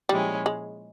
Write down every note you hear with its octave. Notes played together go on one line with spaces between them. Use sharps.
A#2 F3 G3 G#3 C#4 E4
G#3